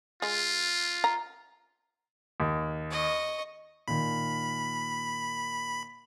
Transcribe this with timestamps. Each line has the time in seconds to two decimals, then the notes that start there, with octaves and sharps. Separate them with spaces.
0.22 G#3 F4
1.04 A#5
2.40 D#2
2.91 D#5 C#6
3.88 A#2 D#3 B5